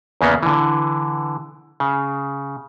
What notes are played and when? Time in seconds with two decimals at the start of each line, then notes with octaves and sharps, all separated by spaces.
0.21 E2 C#3 A#3 B3
0.43 D3 E3
1.80 C#3